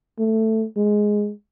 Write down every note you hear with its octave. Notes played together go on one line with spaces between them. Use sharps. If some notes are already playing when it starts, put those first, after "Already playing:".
A3
G#3